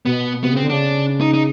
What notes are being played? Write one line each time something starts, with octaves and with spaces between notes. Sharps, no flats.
B2 B3
C3 B3
C#3 C4
D3
C#3 D4
D#4
D#4